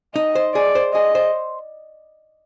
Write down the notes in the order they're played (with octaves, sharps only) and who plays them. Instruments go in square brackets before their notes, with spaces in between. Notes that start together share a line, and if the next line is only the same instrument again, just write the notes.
[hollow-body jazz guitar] D#4 [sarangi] D#5
[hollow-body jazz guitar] C5
[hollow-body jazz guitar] G#4 [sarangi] D5
[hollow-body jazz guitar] C5
[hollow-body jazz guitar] G#4 [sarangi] D#5
[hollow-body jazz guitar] C5